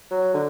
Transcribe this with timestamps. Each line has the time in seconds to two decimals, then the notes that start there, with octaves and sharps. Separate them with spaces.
0.11 F#3
0.34 D3